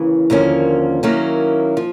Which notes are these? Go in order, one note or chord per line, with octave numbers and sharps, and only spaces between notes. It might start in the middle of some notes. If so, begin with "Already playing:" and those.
Already playing: D#2 C#3 E3
D#2 D3 F3 A#3 C#4
D#3 F#3 A#3 C#4 E4
F3